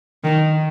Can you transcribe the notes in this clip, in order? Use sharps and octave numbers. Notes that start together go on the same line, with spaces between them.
D#3